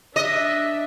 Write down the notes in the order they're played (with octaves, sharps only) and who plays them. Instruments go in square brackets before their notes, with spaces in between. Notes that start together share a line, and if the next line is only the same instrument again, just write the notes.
[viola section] D4 E5 [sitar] D#5